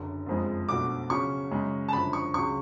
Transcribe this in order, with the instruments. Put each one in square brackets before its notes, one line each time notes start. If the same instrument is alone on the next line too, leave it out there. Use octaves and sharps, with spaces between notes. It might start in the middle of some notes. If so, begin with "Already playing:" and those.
Already playing: [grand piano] F#1 F#2 D3
F#1 F2 F3 G#3
[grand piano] B1 B2 A3 D4 F#4 [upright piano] D6
[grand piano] C#3 F#3 C#4 [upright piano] C#6
[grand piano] F#2 C#3 G#3
[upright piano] A5
[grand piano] G#1 F#2 D3 F3 [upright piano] B5
[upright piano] C#6
[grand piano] C#2 C#3 F#3 [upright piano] C#6